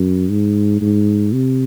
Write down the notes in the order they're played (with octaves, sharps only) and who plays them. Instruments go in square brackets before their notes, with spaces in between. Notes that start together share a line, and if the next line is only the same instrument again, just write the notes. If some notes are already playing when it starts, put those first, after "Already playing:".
Already playing: [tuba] F#2
G#2
G#2
C3